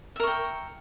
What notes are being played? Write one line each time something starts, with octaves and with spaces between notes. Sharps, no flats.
A#4 E5 G5 C#6